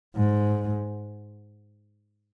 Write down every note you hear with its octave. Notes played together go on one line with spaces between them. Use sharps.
G#2